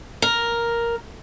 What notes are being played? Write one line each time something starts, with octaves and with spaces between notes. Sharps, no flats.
A#4